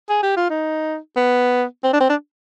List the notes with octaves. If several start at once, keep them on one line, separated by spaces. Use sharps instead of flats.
G#4
G4
F4
D#4
B3
C4
D4
C4
D4